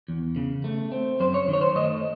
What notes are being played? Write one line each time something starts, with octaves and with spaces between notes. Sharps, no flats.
E2
C#3
A3
C4
F#2 C5
C#5
D#3
C#5
C5
A3 D#5